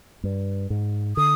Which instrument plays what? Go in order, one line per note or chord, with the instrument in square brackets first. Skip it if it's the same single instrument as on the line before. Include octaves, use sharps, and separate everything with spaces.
[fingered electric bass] G2
G#2
[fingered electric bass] D3 [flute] D#6